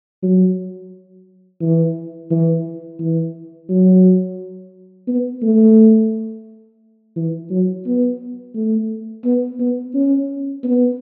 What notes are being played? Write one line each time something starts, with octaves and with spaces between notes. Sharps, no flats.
F#3
E3
E3
E3
F#3
B3
A3
E3
F#3
B3
A3
B3
B3
C#4
B3